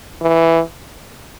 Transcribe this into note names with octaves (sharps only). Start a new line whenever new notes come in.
E3